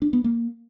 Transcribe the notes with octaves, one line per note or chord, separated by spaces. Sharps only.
D4
B3
A#3